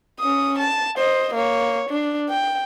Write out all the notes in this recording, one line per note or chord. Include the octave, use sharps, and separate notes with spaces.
C#4 D#6
A5
C5 D#5
A#3 C#5
D4
G5